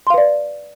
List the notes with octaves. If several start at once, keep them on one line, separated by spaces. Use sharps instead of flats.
B4 D5 F5 C6